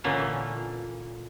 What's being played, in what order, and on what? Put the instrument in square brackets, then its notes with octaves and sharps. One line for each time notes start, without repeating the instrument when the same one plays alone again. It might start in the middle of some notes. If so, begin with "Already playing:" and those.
[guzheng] A#2 D3 E3 A#3 C#4